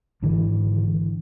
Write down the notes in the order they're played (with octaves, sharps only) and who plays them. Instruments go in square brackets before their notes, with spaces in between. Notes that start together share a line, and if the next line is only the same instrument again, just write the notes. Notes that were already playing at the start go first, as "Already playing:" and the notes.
[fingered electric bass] G#1 D3 E3